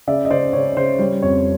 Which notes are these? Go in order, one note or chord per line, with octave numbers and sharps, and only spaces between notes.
C#3 D5 E5
D#5
C#3 C5 D5
C#3 C#5
C#3 C5
G3 C#5
F2 C#5